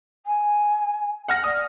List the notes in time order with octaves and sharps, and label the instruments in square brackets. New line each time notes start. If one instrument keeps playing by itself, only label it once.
[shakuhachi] G#5
[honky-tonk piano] F#5 F6 A#6
[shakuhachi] D5 [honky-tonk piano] D#6